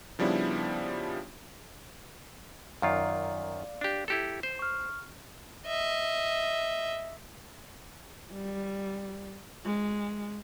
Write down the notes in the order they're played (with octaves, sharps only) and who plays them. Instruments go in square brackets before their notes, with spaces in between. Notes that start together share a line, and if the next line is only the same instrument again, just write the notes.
[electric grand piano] C#3 F3 G3 B3 D4 E4
[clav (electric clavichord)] F#2 D#3 F4 [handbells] D5 F5
[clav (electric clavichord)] D4 G4
E4 G4 A4
C5
[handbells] C#6 F6
[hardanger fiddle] D#5 E5
[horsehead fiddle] G3
G#3